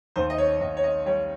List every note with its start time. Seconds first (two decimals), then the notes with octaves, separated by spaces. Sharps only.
0.16 D#2 C5
0.30 D#5
0.38 C#5
0.60 D#2 D#5
0.77 C#5
0.84 D#5
1.06 G3 C#5